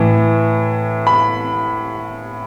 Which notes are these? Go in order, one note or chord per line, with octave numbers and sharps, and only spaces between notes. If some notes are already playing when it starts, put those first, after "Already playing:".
Already playing: A2 E3
B5